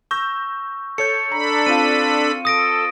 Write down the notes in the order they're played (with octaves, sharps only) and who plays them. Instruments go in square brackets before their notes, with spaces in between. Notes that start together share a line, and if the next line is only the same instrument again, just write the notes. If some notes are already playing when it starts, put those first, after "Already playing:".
[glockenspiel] C#6 [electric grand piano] E6 G6 A#6
[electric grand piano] A4 C#5 G6 [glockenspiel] C#7
[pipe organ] D4 A4 B5 [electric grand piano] A#5
[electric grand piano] C4 F4 F5 [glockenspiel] D#7
[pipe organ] A4 [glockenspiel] D#6 A#6 D7